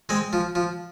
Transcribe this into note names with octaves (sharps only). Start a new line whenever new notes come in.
G#3 C4
F3
F3